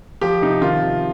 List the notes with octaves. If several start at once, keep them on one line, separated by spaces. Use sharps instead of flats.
F3 G4
C3 D#4
D#3 F4
C3